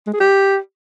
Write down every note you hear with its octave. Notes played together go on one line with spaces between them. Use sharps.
G#3
G#4
G4